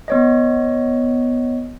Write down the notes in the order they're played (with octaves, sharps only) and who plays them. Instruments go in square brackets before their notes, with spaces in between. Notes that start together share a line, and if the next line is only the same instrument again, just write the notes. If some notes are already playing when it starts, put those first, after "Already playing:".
[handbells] B3 C#5 D#5